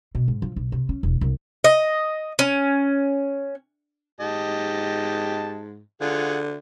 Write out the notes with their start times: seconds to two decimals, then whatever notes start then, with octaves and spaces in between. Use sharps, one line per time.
0.15 B2
0.28 G#2
0.42 F3
0.56 B1
0.72 C3
0.89 C#4
1.03 E1
1.21 C2
1.64 D#5
2.39 C#4
4.20 G#2 G4 D#5 A5
6.01 D3 F4 G#4 F#5